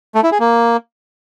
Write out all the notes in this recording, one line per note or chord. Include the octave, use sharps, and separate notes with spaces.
A3
E4
G#4
A#3